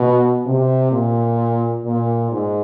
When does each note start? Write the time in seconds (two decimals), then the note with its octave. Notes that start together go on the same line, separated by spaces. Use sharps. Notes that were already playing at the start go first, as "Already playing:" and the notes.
Already playing: B2
0.46 C3
0.92 A#2
1.85 A#2
2.32 G#2